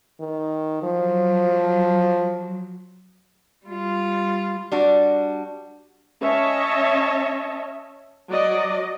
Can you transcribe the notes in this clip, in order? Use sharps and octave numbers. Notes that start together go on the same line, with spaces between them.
D#3
F3 F#3
G3 F4
G3 D4 F#4
C#4 C#5 D#5 E5 A5
F#3 D5 D#5